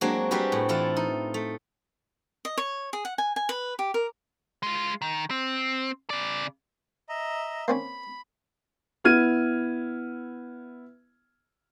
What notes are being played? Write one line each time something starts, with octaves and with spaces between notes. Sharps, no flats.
F#3 G#3 A#3 C4 D4 F#4
G3 G#3 C4 F#4 G4 B4
A2
E3 E4 F4 A4
D#4
A3
D#5
C#5
G#4
F#5
G#5
G#5
B4
G4
A#4
G#3 F4
D#3
C4
C#3 D5
D#5 E5 A#5
A#3 C4 C#4 B5
B3 E4 F6 G#6 D#7